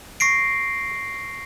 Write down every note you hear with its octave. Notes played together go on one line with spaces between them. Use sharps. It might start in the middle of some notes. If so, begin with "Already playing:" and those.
C#6 A#6 C7 D7